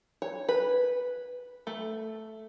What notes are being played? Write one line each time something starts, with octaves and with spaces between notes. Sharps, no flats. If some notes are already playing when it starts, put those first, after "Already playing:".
C#5
B4
A3